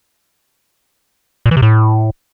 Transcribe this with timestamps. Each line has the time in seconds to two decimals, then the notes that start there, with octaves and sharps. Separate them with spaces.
1.46 A#2
1.51 E3
1.57 C3
1.62 A2